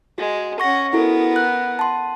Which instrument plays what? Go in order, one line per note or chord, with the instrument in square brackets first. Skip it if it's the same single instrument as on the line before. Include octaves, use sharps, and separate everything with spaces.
[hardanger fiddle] G#3 [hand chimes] F#4
[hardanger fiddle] C#4 F#5 [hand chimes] C#6 A#6
[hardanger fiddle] B3 A#4 [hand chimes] E4 F#4 A4
[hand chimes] F#6
A5 C6